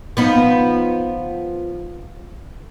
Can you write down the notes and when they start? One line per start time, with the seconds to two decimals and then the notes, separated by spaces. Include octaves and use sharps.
0.17 F3 B3 D#4